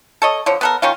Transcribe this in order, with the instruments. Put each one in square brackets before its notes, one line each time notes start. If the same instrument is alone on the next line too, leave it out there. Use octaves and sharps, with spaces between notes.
[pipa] A4 C#5 D#5
D3 F3 C#5
B3 A4 A#4
D#3 C#4 F4